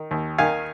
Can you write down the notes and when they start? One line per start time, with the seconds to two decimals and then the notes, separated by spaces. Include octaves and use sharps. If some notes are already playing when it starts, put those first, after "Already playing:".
Already playing: D#3
0.11 D#2
0.38 D#3 F5 G#5